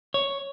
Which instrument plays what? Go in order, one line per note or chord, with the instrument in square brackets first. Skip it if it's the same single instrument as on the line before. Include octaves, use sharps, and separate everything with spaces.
[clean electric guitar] C#5